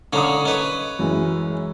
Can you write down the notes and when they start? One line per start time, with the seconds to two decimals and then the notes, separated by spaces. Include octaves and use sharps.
0.13 D3 C#4 F5 A#5 D#6
0.45 C#4 B4 D#5
0.99 F#2 E3 G#3